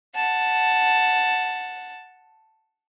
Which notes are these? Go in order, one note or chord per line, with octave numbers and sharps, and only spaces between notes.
F#5 A5